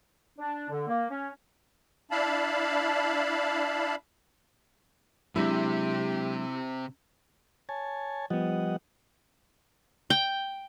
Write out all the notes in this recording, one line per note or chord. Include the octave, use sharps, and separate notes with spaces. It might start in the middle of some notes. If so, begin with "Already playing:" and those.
D4
D3
A#3
C#4
D4 E4 F5 A5 B5
C3 F#3 G#3 D4 E4 G4
C#5 G#5 A5
F3 G3 B3 D#5 F#5
G5